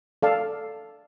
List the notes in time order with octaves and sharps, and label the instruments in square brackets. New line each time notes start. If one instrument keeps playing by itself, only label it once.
[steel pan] A4 D5 F5 A5